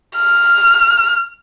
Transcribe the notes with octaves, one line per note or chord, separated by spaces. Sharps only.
F6